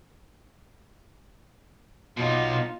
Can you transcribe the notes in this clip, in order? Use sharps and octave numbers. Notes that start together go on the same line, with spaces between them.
B2 D#4 F4